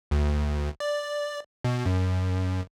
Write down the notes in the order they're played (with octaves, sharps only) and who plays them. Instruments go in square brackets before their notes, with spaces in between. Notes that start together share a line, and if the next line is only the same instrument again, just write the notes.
[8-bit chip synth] D2
D5
B2
F#2